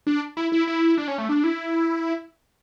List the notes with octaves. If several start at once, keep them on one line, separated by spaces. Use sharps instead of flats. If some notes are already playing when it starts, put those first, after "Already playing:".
D4
E4
E4
E4
D4
C#4
A3
D4
E4